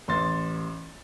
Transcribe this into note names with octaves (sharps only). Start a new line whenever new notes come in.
A1 C6 A6